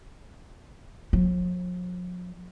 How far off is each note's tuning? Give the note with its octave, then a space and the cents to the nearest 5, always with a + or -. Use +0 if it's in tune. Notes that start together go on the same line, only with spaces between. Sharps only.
F3 +45